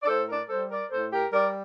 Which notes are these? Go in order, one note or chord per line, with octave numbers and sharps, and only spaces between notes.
D5
A2 A4 C5
A#4 D5
G3 A4 C5
A#4 D5
A2 A4 C5
G4 A#4
G3 A#4 D5